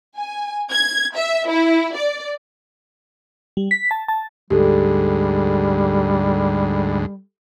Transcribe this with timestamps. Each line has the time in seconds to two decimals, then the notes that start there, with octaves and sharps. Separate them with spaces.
0.17 G#5
0.71 G#6
1.15 E5
1.49 E4
1.96 D5
3.57 G3
3.71 B6
3.91 A5
4.08 A5
4.50 D2 G#2 G3 G4 A4